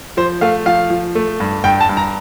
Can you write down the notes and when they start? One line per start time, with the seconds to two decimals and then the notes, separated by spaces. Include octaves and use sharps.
0.17 F3 C5
0.41 A3 F5
0.66 F3 F5
0.90 F3
1.15 A3
1.40 G2
1.64 G2 G5
1.80 A5
1.89 G2
1.97 A#5